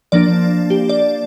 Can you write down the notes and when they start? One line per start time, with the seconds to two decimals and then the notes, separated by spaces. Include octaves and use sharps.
0.12 F3 A#3 D4 D5
0.70 G4
0.89 D5